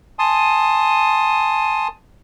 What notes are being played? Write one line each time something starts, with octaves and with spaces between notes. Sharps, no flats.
G#5 A5 C6 D#6